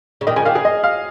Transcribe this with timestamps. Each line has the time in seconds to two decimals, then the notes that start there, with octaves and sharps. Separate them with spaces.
0.21 C#3
0.27 A#2 D#3 D#5
0.36 C#3 F3 G#5
0.45 A#2 D#3 F5
0.55 C#3 G#4
0.65 D#5
0.84 F5